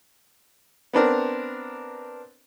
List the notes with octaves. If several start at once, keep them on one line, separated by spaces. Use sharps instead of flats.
B3 C4 D4 A#4